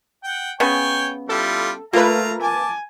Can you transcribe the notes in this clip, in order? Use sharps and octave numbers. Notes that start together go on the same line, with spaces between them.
F#5 G5
C#3 B3 C#5 G5 G#5
G3 E4 F4 A4
A3 A#3 F4 A#4 B4 F5 A#5
G#5 A5 D6